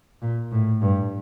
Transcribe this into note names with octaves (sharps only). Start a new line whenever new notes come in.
A#2
A2
G2